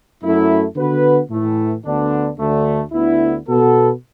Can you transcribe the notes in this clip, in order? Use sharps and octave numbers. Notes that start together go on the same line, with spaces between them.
F#2 F#3 A3 E4
D3 B3 F#4 B4
A2 E3 A3
D2 D3 B3 D4
D2 D3 A3
D2 D3 B3 E4
B2 B3 F#4 A4